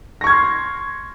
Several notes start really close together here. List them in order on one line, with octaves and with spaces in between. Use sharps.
A#6 C#6 G#6 F6 C6